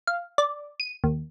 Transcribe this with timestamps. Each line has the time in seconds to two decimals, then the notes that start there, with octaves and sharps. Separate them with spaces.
0.07 F5
0.38 D5
0.80 D#7
1.04 D#2